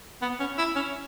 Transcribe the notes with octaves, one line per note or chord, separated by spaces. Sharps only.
B3
C#4
E4
C#4